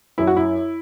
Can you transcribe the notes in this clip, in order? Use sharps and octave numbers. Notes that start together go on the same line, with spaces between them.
F#2 E4
F#4
E4